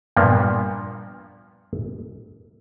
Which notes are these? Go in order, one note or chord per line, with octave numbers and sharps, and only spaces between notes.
G2 A#2 F3 A#3 B3